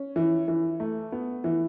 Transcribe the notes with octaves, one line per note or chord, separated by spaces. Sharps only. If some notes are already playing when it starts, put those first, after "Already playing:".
Already playing: C#4
E3
E3
A3
B3
E3